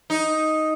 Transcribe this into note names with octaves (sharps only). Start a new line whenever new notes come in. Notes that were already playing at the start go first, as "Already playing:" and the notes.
D#4